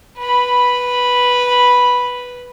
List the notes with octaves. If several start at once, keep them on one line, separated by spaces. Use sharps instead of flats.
B4 B5